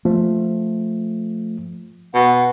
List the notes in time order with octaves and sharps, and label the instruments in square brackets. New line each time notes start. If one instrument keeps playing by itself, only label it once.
[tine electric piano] F3 [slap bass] A3
[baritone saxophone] B2 [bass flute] F#5